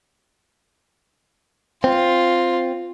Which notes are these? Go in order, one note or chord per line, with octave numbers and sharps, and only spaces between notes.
C4 F4